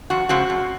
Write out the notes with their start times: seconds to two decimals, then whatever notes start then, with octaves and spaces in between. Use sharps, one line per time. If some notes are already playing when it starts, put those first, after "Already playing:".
0.10 F2 F#4
0.29 C#3 G#3 C4 F#4
0.50 F#2